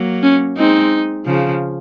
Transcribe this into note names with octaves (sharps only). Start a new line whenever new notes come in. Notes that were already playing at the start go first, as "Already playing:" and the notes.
Already playing: F#3 A#3
C#4
G#3 C4 D#4
C#3 F3